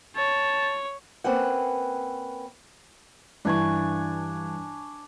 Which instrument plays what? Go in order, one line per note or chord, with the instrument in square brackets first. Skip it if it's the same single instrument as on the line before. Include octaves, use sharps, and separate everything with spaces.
[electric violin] C#5 [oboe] A5
[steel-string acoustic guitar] A#3 C4 C#4 B4 F#5
[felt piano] G2 E3 [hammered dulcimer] D4 G#5 C#6